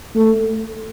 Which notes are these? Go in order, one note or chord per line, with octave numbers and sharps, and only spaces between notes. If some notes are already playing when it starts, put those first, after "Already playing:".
A3